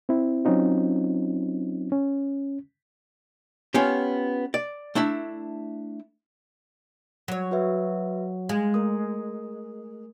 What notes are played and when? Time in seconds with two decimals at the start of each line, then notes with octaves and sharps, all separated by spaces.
0.09 C4 E4
0.45 F#3 C4 C#4 D#4 F4
1.92 C#4
3.74 B3 C#4 F4 G4
4.54 D5
4.95 A3 D4 E4 E5
7.28 F#3 C#5
7.51 F#4 B4 E5
8.49 G#3 F5
8.74 A3 A#4 D#6